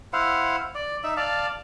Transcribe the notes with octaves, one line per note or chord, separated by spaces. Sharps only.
E4 C5 F5 F#5
D5
D#4 E5
D5 F5 A5